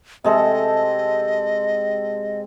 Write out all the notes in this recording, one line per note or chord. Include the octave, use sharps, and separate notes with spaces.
C3 G#3 A4 D#5